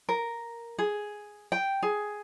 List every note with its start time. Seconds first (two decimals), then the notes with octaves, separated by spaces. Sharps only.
0.09 A#4
0.79 G#4
1.52 G5
1.83 G#4